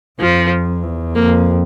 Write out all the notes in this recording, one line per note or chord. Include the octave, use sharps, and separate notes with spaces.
F2 F3
E2
F2 A#3